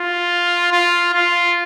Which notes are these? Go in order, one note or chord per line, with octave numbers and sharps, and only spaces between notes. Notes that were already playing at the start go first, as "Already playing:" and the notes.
Already playing: F4
F4
F4